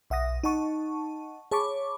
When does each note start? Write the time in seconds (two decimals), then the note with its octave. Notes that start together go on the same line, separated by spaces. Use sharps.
0.10 B1 E5 F#5 D#6 A#6
0.44 D#4 D#5 F#5 A5 C#6
1.51 G#4 C#5 A5 B5 C#6 D6